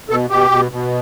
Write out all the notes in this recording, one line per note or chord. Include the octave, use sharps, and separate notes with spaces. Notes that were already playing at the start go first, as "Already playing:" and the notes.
B2 A4
B2 G4
B2
B2